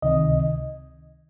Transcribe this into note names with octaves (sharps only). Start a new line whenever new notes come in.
C#2 C3 D#3 D#5